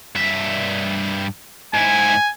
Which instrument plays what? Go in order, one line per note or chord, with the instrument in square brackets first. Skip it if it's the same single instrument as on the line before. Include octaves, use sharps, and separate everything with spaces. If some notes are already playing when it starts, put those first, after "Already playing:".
[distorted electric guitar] G2 E5
[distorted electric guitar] G#2 E4 [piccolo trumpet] G#5